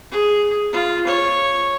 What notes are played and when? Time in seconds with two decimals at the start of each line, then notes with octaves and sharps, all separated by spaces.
0.11 G#4
0.73 F4
1.06 C#5